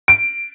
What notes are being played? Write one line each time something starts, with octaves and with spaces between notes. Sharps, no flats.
D7